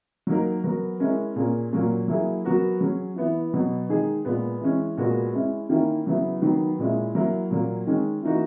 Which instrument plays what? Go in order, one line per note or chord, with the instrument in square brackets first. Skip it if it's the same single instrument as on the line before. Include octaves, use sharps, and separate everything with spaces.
[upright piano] F#3 A#3 D#4 A#4
F#3 B3 F#4 A#4
G#3 C#4 E4 A#4
A#2 A#3 C#4 G#4
A#2 F#3 A#3 C#4
F#3 A#3 E4 G#4
F#3 B3 F#4 A#4
F#3 C#4 G#4
E3 B3 E4
B2 F#3 B3
D#3 G#3 D#4 G#4
A#2 G#3 B3
E3 G#3 C#4
A#2 G#3 B3 F#4 A#4
G#3 C#4 E4
D#3 A#3 C#4 E4
C#3 F#3 B3 E4
D#3 F#3 B3
A#2 G#3 C#4 E4
F#3 A#3 E4 A#4
A#2 F#3 A#3
D#3 G#3 C#4
E3 A#3 D#4 F#4